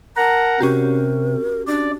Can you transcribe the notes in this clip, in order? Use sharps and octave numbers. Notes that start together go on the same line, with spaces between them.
A#4 F#5 A5 A#5
C3 C#4 F#4 G4 A#4
D4 D5